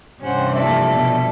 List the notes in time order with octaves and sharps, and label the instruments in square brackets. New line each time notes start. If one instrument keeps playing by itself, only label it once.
[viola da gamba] G2 C3 E3 [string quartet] C#4 C5 F#5
[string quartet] F3 A4 D5 [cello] A#3 E4 [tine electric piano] E5
[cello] B2